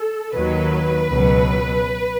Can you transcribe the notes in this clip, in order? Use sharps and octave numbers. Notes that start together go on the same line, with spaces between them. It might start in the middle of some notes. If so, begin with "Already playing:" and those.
Already playing: A4
D#2 D#3 F#3 B4
C#2 B2 F#3